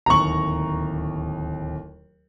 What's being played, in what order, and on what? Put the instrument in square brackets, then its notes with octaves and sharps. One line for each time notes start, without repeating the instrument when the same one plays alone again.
[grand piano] D1 D#2 F#7 [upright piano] A#5 C#6